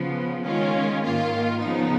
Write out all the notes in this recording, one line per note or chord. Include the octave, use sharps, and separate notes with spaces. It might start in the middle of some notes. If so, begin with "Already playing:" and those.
Already playing: C#3 F3 B3
D#3 G#3 C#4 F4
G#2 D#3 A#3 F4
C#3 F3 B3 D#4